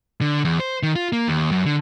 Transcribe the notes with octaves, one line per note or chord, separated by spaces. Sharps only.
D3
E2
C5
D#3
F4
A#3
D#2
F#2
D3